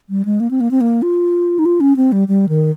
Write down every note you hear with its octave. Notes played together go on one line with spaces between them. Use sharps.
G3
G#3
A#3
C4
A#3
C4
A#3
F4
D#4
F4
C#4
C4
G3
G3
D#3